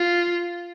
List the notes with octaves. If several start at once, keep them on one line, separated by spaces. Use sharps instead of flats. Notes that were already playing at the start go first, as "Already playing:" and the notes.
Already playing: F4